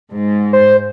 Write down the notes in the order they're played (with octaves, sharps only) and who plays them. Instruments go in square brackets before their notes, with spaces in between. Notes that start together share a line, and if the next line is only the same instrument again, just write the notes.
[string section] G#2
[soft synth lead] C5